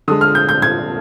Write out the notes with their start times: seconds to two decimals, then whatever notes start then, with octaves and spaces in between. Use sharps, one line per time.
0.08 D3 G#3 D#6
0.21 F6
0.35 G6
0.49 G6
0.62 G#6